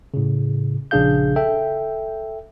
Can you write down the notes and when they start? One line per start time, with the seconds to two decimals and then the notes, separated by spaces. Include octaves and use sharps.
0.14 A2 C#3
0.91 A#1 C#3 D4 G#4 F5 G6
1.36 A4 E5 G5